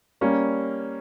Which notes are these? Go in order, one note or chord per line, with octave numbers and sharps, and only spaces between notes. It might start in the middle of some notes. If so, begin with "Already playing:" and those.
G3 A#3 C#4